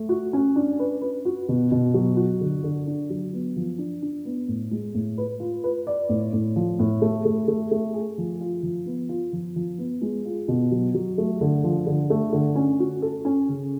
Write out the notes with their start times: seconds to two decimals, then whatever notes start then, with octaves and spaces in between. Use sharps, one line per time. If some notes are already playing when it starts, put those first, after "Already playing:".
Already playing: A3
0.09 F#4
0.33 C#4
0.56 D4
0.79 B4
1.01 B4
1.25 F#4
1.49 B2
1.71 B2
1.94 F#3
2.17 F#4
2.41 D3
2.64 D3
2.87 D4
3.10 F#3
3.33 B3
3.56 F3
3.78 D4
4.02 D4
4.25 B3
4.48 A2
4.71 G#3
4.94 A2
5.18 B4
5.40 F4
5.64 B4
5.87 D5
6.09 A2
6.33 A2
6.56 F3
6.79 A2
7.02 A3
7.25 A3
7.48 A3
7.71 A3
7.94 G#4
8.18 F3
8.41 F4
8.63 F3
8.86 B3
9.09 F4
9.33 F3
9.56 F3
9.78 B3
10.01 G#3
10.25 F4
10.48 B2
10.71 F#3
10.94 F#3
11.18 A3
11.41 D3
11.64 F3
11.86 D3
12.10 A3
12.33 D3
12.55 C#4
12.80 F#4
13.02 A4
13.25 C#4
13.48 C#3